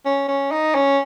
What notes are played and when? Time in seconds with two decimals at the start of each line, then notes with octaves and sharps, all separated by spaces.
0.05 C#4
0.28 C#4
0.51 D#4
0.75 C#4